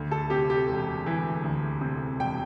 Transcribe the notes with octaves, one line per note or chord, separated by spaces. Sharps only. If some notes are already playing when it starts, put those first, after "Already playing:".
Already playing: D2
A4
C3 G4
G4
E1
E3
D2
C3
E1 G5